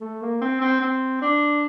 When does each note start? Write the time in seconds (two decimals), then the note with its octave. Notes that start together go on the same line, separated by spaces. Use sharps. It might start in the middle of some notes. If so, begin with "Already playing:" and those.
0.01 A3
0.22 A#3
0.41 C4
0.61 C4
0.80 C4
1.21 D4